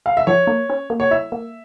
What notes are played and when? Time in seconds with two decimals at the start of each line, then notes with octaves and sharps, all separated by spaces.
0.06 F5
0.17 E5
0.27 F3 C#5
0.47 A#3
0.70 C#4
0.90 A#3
1.00 C#5
1.11 E4 E5
1.32 A#3